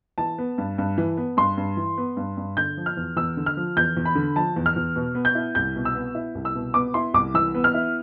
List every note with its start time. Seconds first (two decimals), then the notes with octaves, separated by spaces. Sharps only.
0.18 E3 A5
0.38 B3
0.58 G2
0.78 G2
0.98 E3
1.18 B3
1.37 G2 C6
1.57 G2
1.77 E3
1.98 B3
2.17 G2
2.37 G2
2.57 D3 G6
2.77 F3
2.86 F6
2.97 E2
3.17 E2 E6
3.37 D3
3.46 F6
3.57 F3
3.77 E2 G6
3.97 E2
4.05 B5
4.15 D3
4.36 F3 A5
4.56 E2
4.66 F6
4.76 E2
4.96 B2
5.15 B3
5.25 G6
5.35 E4
5.55 C2 G6
5.76 B2
5.85 E6
5.94 B3
6.15 E4
6.35 C2
6.45 E6
6.55 B2
6.74 B3 D6
6.94 E4 C6
7.14 C2 D6
7.34 E3 E6
7.55 B3
7.64 F6
7.74 E4